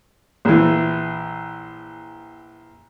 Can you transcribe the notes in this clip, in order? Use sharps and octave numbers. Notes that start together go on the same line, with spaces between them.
A#1 E3